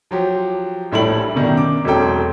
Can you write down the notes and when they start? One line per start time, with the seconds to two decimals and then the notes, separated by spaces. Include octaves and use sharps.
0.11 F3 F#3 G4
0.92 A#1 A2 G3 E4 A4 F#7
1.35 F#2 B2 D#3 D4
1.57 D6
1.84 E1 F#3 C4 A4 G5